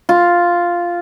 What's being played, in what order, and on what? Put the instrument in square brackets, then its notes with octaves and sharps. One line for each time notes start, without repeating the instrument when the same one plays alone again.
[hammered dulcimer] F4